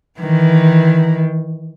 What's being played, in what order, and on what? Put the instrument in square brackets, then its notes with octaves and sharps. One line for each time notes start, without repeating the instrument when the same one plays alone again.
[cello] D#3 E3